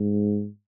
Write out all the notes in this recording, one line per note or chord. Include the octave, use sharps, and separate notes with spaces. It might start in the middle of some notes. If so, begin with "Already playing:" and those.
Already playing: G#2